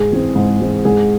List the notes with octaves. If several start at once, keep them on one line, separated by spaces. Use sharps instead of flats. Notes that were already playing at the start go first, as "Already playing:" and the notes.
Already playing: G#2 G#4
E3 G#3 C4
G#2
E3 G#3 C4
G#2 G#4